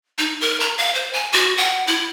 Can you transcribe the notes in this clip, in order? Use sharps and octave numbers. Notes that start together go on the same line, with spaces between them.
D#4
A#4
A#5
F5
C5
G#5
F#4
F#5
E4